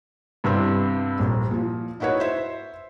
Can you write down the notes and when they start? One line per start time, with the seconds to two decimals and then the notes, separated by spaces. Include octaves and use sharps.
0.44 G2 C3 G3 B3 C4 E4
1.19 D#1 A#1
1.51 A#2 F3
2.00 D#4 E4 F#4 B4 C#5
2.20 C5 E5